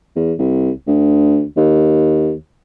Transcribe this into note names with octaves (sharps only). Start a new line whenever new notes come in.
E2
C2
D2
D#2